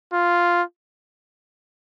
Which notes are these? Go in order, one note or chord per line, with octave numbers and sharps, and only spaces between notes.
F4